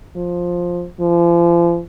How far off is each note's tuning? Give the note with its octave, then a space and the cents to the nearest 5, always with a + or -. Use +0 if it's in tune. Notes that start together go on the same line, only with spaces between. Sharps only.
F3 +10
F3 -35